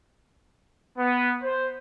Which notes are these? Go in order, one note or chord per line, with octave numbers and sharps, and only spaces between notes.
B3
C5